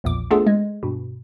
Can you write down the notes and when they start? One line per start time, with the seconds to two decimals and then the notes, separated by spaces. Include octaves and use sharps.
0.04 A#1 E2 A#2 D6
0.31 A3 B3 D4 F4 G#4 A4
0.47 G#3
0.83 G2 B2